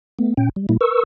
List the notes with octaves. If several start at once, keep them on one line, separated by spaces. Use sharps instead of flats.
A3 B3
A#2 C#4 G5
G3
A#2 G3 A#3 E4
A#4 B4 C#6 E6